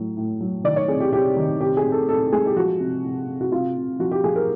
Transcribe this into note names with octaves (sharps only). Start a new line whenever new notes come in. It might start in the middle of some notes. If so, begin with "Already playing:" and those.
Already playing: A2 F#3
A2
F#3
D#3 D5
C#5
C3 G#4
G4
C3 G4
D#3
C3 G4
G#4
C3
A4
C3 A4
G#3 G#4
G4
F3 F#4
C3
C3
C3
F#4
C3 F4
C3
F3 F#4
G4
F3 G#4
A#4